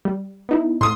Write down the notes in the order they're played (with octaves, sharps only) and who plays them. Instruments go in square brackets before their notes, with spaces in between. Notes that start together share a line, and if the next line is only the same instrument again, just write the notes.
[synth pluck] G3
B3 D#4 E4
[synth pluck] A2 [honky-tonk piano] C6 D#6